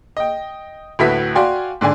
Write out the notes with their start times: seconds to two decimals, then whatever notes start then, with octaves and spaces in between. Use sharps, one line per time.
0.17 D#5 G5
0.99 D2 A2 F#4 B4 E5 B6
1.35 F#4 D5 F5 G5 G#5 C6
1.81 G#2 D3 D5 G#5